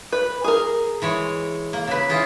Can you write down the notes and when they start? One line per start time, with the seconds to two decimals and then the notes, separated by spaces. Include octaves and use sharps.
0.12 B4
0.44 G#4 A#4
1.02 E3 G#3 C#5
1.73 A#3
1.87 C#3 B4
2.09 E3 F4 G#4